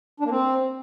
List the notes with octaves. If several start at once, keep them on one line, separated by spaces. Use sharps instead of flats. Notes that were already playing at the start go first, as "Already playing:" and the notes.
D4
A#3
C4